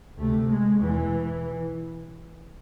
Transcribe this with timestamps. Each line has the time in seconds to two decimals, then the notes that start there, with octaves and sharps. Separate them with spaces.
0.18 D2 C3 A3
0.50 G#3
0.81 E2 B2 E3